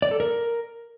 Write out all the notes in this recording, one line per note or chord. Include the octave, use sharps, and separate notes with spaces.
D5
A4
A#4